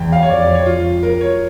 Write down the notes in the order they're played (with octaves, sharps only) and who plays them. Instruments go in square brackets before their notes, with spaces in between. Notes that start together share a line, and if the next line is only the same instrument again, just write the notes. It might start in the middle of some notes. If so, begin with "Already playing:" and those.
Already playing: [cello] E2 [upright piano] G5
[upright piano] F5
C#5
[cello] F2 [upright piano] D5
[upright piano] D5
C#5
[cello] F2 [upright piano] F4
[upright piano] A#4
C#5